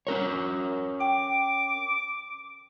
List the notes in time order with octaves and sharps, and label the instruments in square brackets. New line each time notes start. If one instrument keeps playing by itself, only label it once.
[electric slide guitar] C#4 A#4 C#5
[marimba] G5 [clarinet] D6